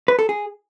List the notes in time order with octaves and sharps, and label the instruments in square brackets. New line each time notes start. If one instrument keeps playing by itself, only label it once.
[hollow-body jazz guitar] B4
A4
G#4